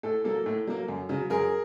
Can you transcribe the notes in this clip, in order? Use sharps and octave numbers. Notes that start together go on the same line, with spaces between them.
A2 A4
F#3 A#3 A4
A2
F#3 A#3
F#2
C#3 F#3
F#2 G#4 A#4